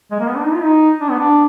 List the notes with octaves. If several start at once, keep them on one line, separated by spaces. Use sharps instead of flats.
G#3
A#3
B3
D4
D#4
F4
D#4
D4
B3
D4